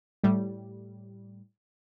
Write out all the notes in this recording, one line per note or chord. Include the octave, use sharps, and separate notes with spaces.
A2 G3